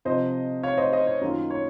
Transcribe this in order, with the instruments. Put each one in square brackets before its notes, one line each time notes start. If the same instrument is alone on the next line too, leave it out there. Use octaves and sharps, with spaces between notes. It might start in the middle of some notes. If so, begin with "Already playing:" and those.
[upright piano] C3 F3 C4 C5 D#5
C#5 F5
C5 D#5
C5 D#5
C#5
F#2 D#3 A#3 F4
C#5